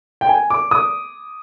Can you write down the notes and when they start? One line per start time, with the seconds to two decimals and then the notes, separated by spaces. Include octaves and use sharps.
0.21 G5
0.29 G#5
0.50 D6
0.71 D#6